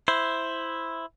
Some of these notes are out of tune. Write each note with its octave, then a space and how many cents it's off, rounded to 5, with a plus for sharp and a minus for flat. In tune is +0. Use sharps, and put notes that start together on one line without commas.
E4 +0 C5 +0